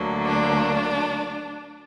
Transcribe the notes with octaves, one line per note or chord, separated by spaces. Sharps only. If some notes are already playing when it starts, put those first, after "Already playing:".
Already playing: D2 D3 F#3 A#3
D4